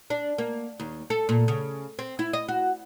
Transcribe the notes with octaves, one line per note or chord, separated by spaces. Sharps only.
D4
A#3
D#2
A4
A#2
C#3
C4
E4
D#5
F#4